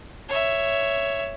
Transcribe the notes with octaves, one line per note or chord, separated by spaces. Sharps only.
C#5 E5